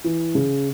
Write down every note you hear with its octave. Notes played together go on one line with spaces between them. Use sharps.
E3
C#3